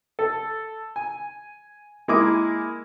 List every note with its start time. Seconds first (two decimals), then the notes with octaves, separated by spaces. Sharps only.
0.19 A4
0.96 G#5
2.08 G#3 A#3 E4 G#4 D6